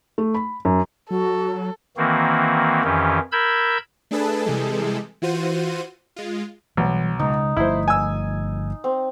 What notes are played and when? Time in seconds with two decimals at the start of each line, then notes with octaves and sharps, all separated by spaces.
0.18 A3
0.34 B5
0.65 F#2
1.11 F#3 F#4 A4
1.97 D#3 E3 A#3 C4 F#4
2.84 F2 D#3 E3 C#4 G4
3.32 A#4 B5 E6 G6 G#6
4.11 A3 D4 G#4 A4 B4 A5
4.44 C3 E3 G3 G#3 G#4 A4
5.22 E3 F4 F#4 C5 D#7
6.16 G#3 F4
6.77 B1 E3 F#3 G3
7.20 C#3 G#3 D#4
7.57 G1 F3 A3 E4 C5
7.88 G#5 E6
8.84 C4